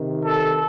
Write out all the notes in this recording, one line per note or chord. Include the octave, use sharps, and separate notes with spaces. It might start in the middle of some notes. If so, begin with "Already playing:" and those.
Already playing: C3 D#3
A4